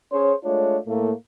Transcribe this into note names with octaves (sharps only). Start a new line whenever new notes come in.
C#4 G#4 C5 C#5
G#3 A3 D4 F4 C#5
A2 A3 A#3